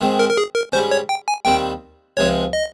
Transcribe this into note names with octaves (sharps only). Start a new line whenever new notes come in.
G#2 D#3 G#3 C4
A#4
A#4
G#4
A#4
G#2 G3 C#4 C5
C#5
G5
G#5
D#2 D#3 G3 C4 G5
C#2 C3 F3 G#3 D#4 C#5
D#5